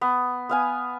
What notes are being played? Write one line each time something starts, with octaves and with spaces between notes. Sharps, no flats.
B3
B3 F5 G#5